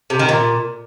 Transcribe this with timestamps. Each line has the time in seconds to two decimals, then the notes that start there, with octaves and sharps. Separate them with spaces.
0.10 C3
0.19 D#3
0.29 A#2